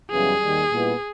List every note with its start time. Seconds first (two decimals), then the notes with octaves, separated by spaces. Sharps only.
0.11 F#2 C#3 E3 G3 B3 G#4
0.39 D#2 D#3 G3
0.69 A#2 G3 B3 E4